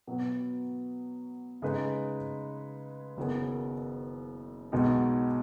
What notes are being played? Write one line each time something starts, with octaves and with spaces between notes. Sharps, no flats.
B2 F#3 B3
C#3 G#3 D#4 G#4 B4
F#1 F#2 D#3 B3 G#4
B1 B2 G#3 B3 D#4